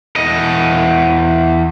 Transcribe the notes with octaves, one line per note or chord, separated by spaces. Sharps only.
E2 D#5